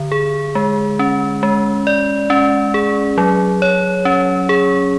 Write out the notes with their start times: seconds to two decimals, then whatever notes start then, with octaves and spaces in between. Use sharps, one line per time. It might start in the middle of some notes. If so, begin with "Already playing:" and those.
Already playing: D3
0.12 G#4
0.55 G#3
0.99 C#4
1.43 G#3
1.87 D5
2.30 C#4
2.74 G#4
3.18 F#3
3.62 C#5
4.05 C#4
4.49 G#4